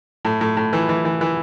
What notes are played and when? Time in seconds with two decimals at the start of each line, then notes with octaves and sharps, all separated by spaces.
0.25 A2
0.41 A2
0.57 A2
0.73 E3
0.89 E3
1.05 E3
1.21 E3